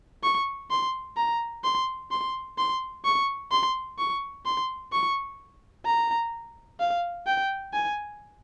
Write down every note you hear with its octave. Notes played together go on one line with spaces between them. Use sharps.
C#6
C6
A#5
C6
C6
C6
C#6
C6
C#6
C6
C#6
A#5
F5
G5
G#5